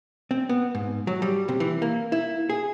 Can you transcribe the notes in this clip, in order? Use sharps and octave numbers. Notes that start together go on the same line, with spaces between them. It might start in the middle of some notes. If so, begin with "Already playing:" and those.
C4
B3
G#2
F#3
G3
C3
E3
A#3
E4
G#4